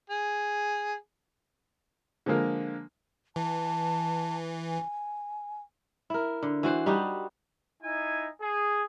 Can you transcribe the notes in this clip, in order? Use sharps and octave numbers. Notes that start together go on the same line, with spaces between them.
G#4
D3 F3 G#3 A#3 A#4
E3 A5
G#5
E4 A#4
D3
E3 F#4 C5
G3 D#4 F#4 G4
D#4 E4 G#5
G#4